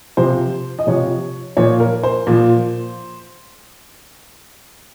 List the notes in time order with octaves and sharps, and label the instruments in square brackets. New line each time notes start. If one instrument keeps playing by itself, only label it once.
[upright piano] C3 F3 C5
D#5
C3 F3 C#5
A#2 F3 C#5
A#4
C5
A#2 F3